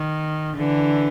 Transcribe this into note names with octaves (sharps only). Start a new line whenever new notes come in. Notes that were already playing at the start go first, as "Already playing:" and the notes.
Already playing: D#3
D3 E3